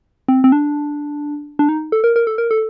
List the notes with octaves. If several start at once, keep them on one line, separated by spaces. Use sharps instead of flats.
C4
C4
D4
D4
D#4
A4
A#4
A#4
A4
A#4
A4